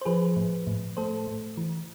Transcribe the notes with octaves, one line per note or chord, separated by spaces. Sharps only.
C5
F3 G#4 B4
A2
A2
A3 A4 C5
A2
E3